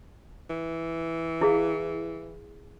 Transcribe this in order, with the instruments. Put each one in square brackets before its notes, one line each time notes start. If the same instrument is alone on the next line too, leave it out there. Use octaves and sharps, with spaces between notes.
[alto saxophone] E3
[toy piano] E4 G#4 F5